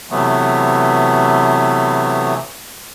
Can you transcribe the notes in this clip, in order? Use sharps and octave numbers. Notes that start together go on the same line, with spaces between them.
C3 E3 F#3 A3 B3